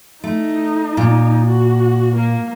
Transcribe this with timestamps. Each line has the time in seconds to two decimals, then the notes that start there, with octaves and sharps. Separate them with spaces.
0.24 A3 D#4
0.97 A#2
1.46 F#4
2.15 A#3